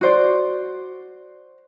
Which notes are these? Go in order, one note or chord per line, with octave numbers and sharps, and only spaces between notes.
F#4 C5 D5